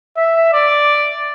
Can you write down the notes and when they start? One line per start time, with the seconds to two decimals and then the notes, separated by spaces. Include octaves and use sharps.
0.17 E5
0.53 D5